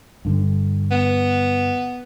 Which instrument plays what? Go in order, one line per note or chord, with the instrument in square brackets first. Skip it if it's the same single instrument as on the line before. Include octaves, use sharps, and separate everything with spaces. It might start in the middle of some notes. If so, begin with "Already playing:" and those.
[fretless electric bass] G2 D3
[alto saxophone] B3